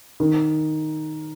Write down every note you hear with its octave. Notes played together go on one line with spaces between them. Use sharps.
D#3